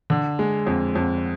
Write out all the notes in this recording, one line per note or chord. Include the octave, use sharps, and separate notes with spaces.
D3
G#3
F2
F2